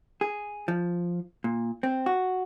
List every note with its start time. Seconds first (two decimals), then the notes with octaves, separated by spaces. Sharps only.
0.21 G#4
0.68 F3
1.44 A#2
1.83 C4
2.06 F#4